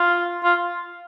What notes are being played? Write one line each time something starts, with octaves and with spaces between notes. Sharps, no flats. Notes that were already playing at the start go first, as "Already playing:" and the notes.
Already playing: F4
F4